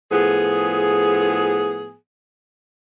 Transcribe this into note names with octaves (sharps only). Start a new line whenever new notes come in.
A2 F3 B3 G#4